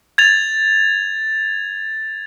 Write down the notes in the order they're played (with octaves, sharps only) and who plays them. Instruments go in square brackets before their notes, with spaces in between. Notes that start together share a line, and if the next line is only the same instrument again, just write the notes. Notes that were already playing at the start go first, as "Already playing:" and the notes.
[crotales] G#6 A6 F7